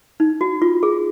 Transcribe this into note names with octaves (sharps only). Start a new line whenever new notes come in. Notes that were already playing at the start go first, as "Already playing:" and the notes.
D#4
F#4
F4
G#4